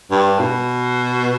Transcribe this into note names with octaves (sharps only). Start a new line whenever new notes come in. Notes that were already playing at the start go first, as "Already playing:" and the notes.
G2
B2